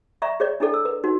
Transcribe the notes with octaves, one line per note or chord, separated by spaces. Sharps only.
D5 E5 A#5 C#6
G#4 C#5 D5
D4 E4 G#4 A4 D5
E6
B4
D#4 F#4